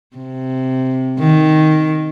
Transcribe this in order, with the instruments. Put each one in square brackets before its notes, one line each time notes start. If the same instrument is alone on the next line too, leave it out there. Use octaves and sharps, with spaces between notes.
[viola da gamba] C3
D#3